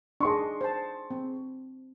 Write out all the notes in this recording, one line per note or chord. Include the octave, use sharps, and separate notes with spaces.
D4 D#4 G#4 D#5 C6 C#6
C5 A5
C4